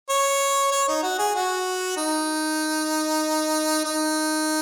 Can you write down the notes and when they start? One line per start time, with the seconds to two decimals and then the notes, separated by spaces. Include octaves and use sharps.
0.09 C#5
0.71 C#5
0.88 D#4
1.03 F#4
1.19 G#4
1.35 F#4
1.97 D#4
3.85 D#4